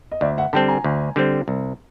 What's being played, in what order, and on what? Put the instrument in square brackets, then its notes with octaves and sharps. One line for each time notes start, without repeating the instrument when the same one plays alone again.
[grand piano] D#5
[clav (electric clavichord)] D2 [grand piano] D5 E5
[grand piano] E5 F#5
[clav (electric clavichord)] D3 G3 C4 [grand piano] G5 A5
[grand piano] G#5 A#5
[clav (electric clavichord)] D2
D3 G3 C4
C2